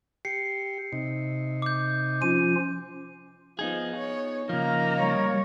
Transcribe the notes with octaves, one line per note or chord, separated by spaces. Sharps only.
G4 C7 C#7
C3 D#4
D6 G6
F3 C#4 F4 D#7
F3 B3 D#4 G#4
C#5
C#3 F3 A#3 D#4 A#5
G3 C#5